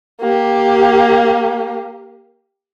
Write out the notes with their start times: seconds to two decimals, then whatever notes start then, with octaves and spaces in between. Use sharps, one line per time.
0.21 A#3 G4